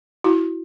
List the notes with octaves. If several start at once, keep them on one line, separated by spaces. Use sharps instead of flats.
E4 F#4